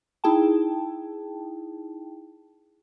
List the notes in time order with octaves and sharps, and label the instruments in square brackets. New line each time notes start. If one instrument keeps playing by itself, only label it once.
[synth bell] D#4 E4 G#4 G5 A5